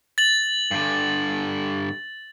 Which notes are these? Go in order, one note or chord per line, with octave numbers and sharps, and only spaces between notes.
A6 F#7
G2 D3